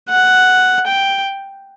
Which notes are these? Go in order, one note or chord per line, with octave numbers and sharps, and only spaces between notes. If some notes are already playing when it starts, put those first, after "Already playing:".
F#5
G5